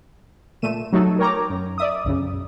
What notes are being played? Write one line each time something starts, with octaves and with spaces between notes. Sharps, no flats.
A#2 A3 D#7 E7
F#3 A3 D#4 F#4 A4
A#4 C#5 G5 A#5 D6
F#2
D5 E5 D#6
B1 F#2 C#3